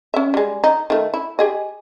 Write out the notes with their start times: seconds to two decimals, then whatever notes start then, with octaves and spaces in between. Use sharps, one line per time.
0.14 C#4 E5
0.34 G3 G#3
0.64 D#4
0.90 D#3 A3
1.14 E4
1.39 G4 G#4 D#5